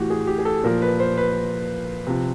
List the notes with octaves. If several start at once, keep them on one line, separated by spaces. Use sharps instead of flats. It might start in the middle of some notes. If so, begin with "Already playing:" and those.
Already playing: A2 E3 F#4 G4
G#4
G4
G#4
A4
A#2 F3 A#4
B4
C5
B4
C3 F3